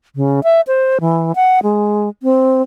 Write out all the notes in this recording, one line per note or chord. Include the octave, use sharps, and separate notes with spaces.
C#3
E5
C5
E3
F#5
G#3
C4